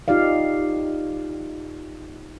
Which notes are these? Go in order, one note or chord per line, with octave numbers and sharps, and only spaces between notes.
D#4 F4 G4 D5 F5